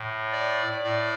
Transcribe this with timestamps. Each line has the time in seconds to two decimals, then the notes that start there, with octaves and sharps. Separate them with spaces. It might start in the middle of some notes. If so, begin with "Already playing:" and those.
Already playing: A2
0.32 D5
0.83 A2 D5